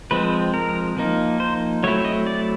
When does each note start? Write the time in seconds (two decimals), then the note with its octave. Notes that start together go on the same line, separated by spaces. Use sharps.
0.11 F3 G#3 C4 B4
0.54 A#4
0.97 F3 A#3 D#4
1.40 C5
1.83 F#3 A3 C4 E4 C#5
2.05 D#5
2.27 D5